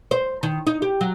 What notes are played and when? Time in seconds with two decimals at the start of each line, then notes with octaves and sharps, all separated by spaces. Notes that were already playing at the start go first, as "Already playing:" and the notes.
0.11 C5
0.43 D#3
0.67 D#4
0.82 G4
1.01 F#3